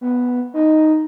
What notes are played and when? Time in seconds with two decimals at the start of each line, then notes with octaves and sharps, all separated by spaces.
0.01 B3
0.54 D#4